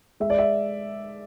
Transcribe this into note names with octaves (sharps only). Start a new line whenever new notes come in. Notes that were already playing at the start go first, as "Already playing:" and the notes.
G#3 E5
D5
E5